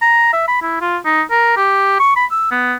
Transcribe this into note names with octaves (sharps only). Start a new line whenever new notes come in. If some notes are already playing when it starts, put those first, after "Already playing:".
A#5
E5
B5
E4
F4
D#4
A#4
G4
C#6
B5
E6
B3